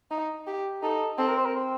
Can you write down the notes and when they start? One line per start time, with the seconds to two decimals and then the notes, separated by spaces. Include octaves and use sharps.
0.11 D#4
0.47 G4
0.83 D#4 A4
1.18 C4 A4
1.28 A#4
1.37 C5
1.45 A#4
1.55 C4